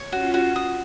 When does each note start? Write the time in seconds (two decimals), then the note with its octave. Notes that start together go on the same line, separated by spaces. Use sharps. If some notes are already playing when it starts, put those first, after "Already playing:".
Already playing: C#5
0.12 C#4 F4 F#4
0.34 F#4
0.56 D#6